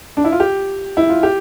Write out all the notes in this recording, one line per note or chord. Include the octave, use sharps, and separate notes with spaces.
D4
E4
F4
G4
E4
F4
G4